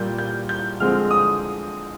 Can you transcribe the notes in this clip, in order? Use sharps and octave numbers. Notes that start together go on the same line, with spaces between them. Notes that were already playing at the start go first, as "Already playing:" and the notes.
Already playing: A#2 G3 A#3 G6
G6
G6
D3 F3 G#3 C4 F6
D#6